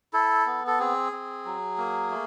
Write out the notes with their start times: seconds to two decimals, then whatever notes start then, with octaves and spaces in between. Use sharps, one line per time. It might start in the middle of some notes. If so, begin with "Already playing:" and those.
0.13 E4 A4
0.46 B3
0.67 A4
0.79 C4 G#4
1.12 C4
1.45 F#3
1.78 A#3
2.11 A3